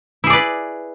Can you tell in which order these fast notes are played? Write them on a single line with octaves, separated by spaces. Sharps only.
E4 G#4 D5 B4